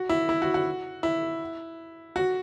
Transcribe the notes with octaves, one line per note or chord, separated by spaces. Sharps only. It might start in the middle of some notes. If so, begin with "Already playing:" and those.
Already playing: F#4
E4
E4
F#4
F#4
E4
F#4